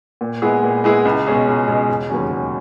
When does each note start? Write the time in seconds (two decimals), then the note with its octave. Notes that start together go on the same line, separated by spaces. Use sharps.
0.21 A#2
0.42 G#3 B3 E4 G#4
0.63 A#2
0.84 G#3 B3 E4 G#4
1.05 C#2
1.26 B2 G#3 C#4 G#4
1.47 C#2
1.68 B2 G#3 C#4 G#4
1.89 E1
2.10 D#2 C#3 F#3 C#4
2.30 E1